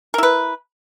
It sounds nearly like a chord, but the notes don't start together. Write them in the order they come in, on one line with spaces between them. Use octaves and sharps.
A#4 E4 B4